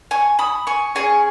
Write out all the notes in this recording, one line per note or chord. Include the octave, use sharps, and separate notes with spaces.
G#5 C#6
B5 D#6
G#5 C#6
C#4 G#4 G#5 C#6